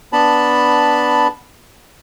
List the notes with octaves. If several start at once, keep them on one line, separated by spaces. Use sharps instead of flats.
B3 D4 A5 B5